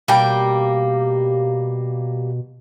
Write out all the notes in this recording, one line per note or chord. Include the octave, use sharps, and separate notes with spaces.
B2 G3 A#3 G5